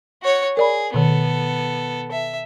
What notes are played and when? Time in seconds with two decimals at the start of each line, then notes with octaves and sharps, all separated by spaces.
0.22 F#4 C#5
0.57 G#4 A#4 D5 B5
0.94 B2 D#3 B3 A4
2.12 E5